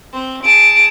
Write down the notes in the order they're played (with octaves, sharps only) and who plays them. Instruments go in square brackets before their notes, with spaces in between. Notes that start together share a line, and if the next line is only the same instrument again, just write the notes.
[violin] C4
[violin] G#4 A5 [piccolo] D7